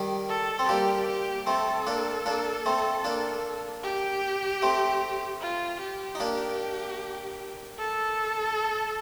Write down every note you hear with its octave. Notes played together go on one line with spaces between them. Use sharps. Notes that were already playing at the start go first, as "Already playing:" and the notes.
Already playing: D#3 G3
A4
C4
G3 A#3 G4
G4
A3 C4 A4
A#3 D4
A#3 D4
A3 C4
A#3 D4
G4
A3 C4
F4
G4
D#4
A#3 D4
A4